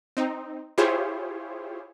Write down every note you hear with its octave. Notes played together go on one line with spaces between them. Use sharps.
C4 D#4
E4 F4 G4 G#4 C5 C#5